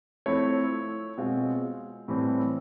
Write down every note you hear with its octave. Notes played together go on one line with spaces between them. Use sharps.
F3 A3 C4 E4 C#5
B2 G#3 C4 F4
A2 E3 G3 C4